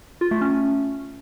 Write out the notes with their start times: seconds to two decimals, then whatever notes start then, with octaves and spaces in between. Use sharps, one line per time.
0.21 F4
0.31 A3
0.41 C#4